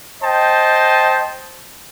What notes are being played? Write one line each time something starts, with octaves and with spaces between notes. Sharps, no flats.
C5 D#5 G5 A5